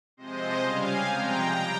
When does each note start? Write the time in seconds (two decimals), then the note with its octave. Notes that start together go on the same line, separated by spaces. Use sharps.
0.17 C3 F3 G#3 C5 D#5
0.61 C#3 G3 F5 G#5
1.05 C3 F3 G#3 G5 A#5
1.49 G3 G5 A#5